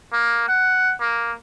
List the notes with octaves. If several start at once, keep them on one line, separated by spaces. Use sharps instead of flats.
A#3
F#5
A#3